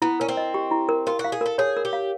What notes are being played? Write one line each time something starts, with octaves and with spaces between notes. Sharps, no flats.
B3 E4
C#4 A#4
C4
D#5
G4
E4
A#4
F4 A#4
F#4
F5
G#4
A4 A#4
G#4 C#5
A#4
G4
F5